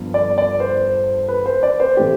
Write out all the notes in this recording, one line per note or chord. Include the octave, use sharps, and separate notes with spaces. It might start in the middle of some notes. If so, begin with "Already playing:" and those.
Already playing: G1 G2 F3 B3
D5
D5
C5
B4
C5
D5
C5
A2 E3 A3 C4 G4